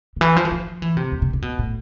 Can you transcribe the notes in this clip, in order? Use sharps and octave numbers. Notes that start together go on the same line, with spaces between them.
D3
E3
F3
E3
F3
E3
C3
E2
C3
C3
B2
A2